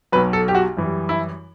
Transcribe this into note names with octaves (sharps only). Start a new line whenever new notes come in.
B1 B2 F#3 B4
A4
G4
F#4
F#2 E3 G3
E4